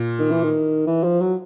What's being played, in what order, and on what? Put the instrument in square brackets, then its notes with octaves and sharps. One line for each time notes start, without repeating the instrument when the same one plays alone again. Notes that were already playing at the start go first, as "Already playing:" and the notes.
Already playing: [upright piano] A#2
[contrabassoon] D#3
E3
D#3
E3
F3
F#3